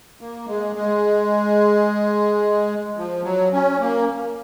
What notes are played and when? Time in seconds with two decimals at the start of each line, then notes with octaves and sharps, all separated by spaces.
0.21 A#3
0.48 G#3
0.76 G#3
2.97 F3
3.24 F#3
3.53 C#4
3.80 A#3